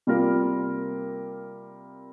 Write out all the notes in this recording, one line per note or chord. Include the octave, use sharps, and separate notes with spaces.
C3 G3 A#3 F4 A#4